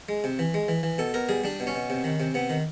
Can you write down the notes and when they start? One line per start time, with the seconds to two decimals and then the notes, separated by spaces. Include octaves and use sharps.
0.09 G#3
0.24 C3
0.39 E3
0.54 G#3
0.68 E3
0.83 E3
0.98 B2 A4
1.14 B2 A#4
1.29 G3 G#4
1.44 G3 D4
1.60 B2
1.67 C#4
1.75 B2
1.90 C3
2.04 D#3
2.20 C3
2.34 C3 B3
2.50 D#3